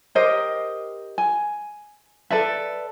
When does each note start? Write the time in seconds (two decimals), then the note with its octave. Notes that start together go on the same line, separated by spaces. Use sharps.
0.15 G4 A#4 C5 D#5
1.18 G#5
2.30 A4 B4 D5 E5